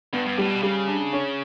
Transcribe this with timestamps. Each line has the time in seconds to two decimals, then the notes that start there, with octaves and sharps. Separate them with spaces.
0.13 G2 B3
0.26 G2
0.38 A2 G3
0.51 B2
0.63 C#3 G3
0.88 D4
1.13 C#4